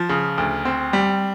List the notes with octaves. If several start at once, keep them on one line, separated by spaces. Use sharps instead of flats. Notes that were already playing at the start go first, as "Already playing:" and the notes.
Already playing: F3
C#3
D2
C4
G3